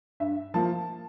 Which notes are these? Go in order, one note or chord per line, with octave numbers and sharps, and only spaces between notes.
G2 E5
F3 A#3 A5